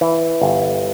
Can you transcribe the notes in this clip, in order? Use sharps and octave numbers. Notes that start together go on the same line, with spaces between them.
E3
G1